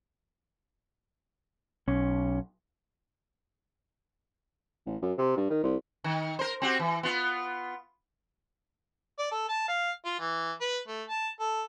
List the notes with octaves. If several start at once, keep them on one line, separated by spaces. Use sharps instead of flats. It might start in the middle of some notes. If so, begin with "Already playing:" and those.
B1 C#4
A1
F#2
C3
G2
D#3
C2
D#3
A#4 C5
C4 F#4 G4
E3
B3 F4
D5
A4
A5
F5
F4
E3
B4
A3
A5
A4